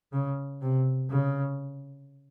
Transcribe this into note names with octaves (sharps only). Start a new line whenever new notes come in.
C#3
C3
C#3